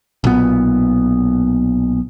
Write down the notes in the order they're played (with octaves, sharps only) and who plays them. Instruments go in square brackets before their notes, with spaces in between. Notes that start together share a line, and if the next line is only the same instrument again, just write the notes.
[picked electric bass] B1 A#2 B3